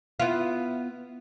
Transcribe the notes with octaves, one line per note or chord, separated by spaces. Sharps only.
B3 E4 F4